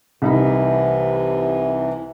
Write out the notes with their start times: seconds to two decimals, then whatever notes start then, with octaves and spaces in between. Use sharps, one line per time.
0.22 C2 C3 E3 D#4 B5